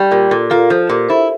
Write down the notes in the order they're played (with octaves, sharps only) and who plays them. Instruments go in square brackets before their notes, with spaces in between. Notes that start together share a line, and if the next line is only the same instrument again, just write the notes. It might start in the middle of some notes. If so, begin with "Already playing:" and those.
Already playing: [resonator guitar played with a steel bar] G3
[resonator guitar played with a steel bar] A#2 [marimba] G4 A#4
[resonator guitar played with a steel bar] A#2 [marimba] F4 A4
[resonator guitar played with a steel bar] A#3 [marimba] F4 A4
[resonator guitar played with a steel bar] F3 [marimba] A4 C5
[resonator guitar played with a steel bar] A#2 [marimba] G4 A#4
[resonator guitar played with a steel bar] E4 [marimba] A4 C5